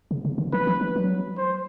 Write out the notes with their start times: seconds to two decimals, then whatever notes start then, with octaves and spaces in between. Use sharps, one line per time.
0.11 C#3
0.25 C#3
0.38 D#3
0.52 F3 B4
0.67 F3
0.81 F3
0.96 F#3
1.38 C5